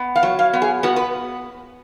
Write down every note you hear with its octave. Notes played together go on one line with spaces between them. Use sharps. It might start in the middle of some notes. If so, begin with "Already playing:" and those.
Already playing: B3
F5
F#3
F5
B3
G#4
B3 F#4
B4